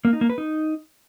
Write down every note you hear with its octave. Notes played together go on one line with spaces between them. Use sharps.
A#3
D#4
A#3
B4
D#4